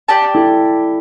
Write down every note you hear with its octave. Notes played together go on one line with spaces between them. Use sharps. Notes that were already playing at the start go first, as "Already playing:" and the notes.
G4 D5 A5
E4 A4